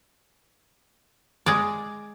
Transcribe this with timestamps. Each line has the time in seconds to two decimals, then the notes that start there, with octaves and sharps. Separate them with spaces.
1.46 G#3 D5